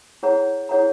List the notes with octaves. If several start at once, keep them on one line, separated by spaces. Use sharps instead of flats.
E4 G#4 C#5 F#5 A#5
E4 G#4 C#5 F#5 A#5